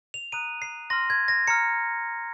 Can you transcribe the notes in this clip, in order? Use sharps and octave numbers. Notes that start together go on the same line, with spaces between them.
F7
A#5 D#6 F#6 D#7
C7
C6 F6 A#6
G#6
A#6
A#5 F6 C#7